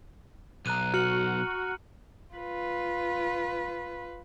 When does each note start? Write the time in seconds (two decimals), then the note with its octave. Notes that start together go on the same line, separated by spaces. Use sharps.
0.66 B1 A#5 F#6 D#7
0.94 F#4 F6 C#7 F#7
2.34 F4 B4